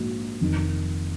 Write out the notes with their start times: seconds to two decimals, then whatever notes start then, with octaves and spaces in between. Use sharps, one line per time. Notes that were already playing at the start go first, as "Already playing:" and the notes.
Already playing: A#1 G#2 F#3 A#3
0.41 F1 F2 D#3